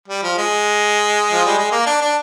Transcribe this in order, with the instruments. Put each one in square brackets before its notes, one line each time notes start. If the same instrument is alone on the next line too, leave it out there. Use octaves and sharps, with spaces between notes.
[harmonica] G3
F3
G#3
F3
G3
G#3
A#3
D4
D4